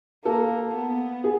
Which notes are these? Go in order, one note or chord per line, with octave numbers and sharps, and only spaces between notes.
A#3 A4
B3
G#4